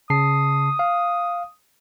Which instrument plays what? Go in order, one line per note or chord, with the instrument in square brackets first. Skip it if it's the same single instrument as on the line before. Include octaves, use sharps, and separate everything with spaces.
[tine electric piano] C#3 A5 C7 [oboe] D#6
[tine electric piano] F5